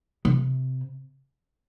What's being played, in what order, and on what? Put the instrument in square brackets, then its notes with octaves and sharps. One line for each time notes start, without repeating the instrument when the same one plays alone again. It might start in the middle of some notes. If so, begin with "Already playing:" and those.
[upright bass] C3